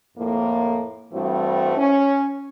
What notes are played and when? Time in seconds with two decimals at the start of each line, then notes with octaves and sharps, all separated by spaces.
0.18 F2 A2 F3 A#3
1.12 G2 E3 G3 A3 C4 F#4
1.77 C#4